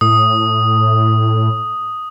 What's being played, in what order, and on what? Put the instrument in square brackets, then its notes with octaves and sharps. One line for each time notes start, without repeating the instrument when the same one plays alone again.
[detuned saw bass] A2 [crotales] D#6